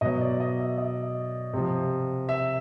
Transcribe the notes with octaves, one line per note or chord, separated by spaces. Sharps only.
B2 F#3 D#5
D5
D#5
E5
D#5
C3 F3
E5